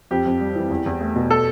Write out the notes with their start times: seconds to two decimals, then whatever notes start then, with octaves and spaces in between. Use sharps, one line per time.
0.11 F2 G4
0.26 F2
0.41 G3
0.56 E3
0.71 E2
0.86 E2
1.01 A3
1.15 B2
1.31 A4